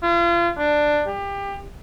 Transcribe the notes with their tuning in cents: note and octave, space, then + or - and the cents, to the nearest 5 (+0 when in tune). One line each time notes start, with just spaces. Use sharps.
F4 -35
D4 +10
G4 +25